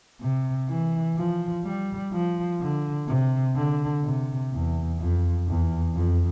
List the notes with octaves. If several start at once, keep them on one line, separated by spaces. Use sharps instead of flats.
C3
E3
F3
G3
F3
D3
C3
D3
C3
E2
F2
E2
F2